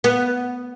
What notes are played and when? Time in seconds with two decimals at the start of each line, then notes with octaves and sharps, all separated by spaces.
0.04 B3